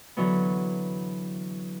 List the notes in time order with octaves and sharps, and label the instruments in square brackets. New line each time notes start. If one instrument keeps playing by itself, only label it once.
[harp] D3 E3 F#3 B3